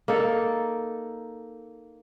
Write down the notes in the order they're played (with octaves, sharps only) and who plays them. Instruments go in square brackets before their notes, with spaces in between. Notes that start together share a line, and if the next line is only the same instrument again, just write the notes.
[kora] A#3 D#4 A4